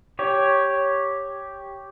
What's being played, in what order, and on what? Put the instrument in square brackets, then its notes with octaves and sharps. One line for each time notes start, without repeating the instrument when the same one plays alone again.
[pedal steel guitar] G4 C#5